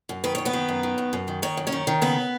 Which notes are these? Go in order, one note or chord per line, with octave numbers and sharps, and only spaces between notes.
F#2
D#3 B4
F#2 C#5
B3 B4
D#3
F#2
D#3
F#2
F#2
D#3
D#3 C#5
F#2
C#4 C#5
D#3
D#3
C#3 B3 B4